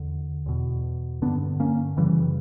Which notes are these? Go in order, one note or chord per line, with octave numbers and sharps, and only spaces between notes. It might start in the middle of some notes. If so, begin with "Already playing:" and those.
Already playing: E2 D3
E2 B2
G2 D3 B3 D4
A#3 C#4
F#2 C#3 E3 G3